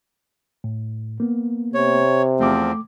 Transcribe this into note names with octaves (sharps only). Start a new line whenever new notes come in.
A2
A#3 B3
C3 C#5
E2 F3 A3 C4 D6